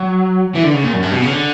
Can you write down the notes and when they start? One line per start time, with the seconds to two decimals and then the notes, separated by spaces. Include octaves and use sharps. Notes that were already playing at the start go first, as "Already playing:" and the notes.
Already playing: F#3
0.55 E3
0.63 D3
0.74 C#3
0.84 A#2
0.93 F#2
1.02 G2
1.12 B2
1.22 C#3
1.31 D3